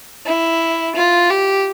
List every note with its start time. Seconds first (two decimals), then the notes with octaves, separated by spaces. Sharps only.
0.26 E4
0.95 F4
1.30 G4